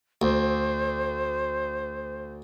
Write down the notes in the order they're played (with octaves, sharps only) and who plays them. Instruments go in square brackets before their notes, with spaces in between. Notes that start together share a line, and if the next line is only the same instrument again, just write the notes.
[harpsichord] D2 [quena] C5